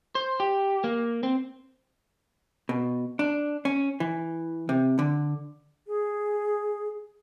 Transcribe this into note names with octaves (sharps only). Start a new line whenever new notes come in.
C5
G4
A#3
C4
B2
D4
C#4
E3
C3
D3
G#4